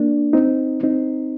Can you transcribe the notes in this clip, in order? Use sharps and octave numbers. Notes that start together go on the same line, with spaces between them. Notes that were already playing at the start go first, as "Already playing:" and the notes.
Already playing: A#3 D4
C4 D#4
C4 D#4